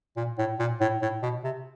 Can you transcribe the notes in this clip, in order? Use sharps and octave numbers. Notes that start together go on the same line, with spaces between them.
A#2
A2
A#2
A2
A2
B2
C3